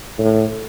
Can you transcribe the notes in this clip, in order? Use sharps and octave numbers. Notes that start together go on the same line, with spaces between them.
A2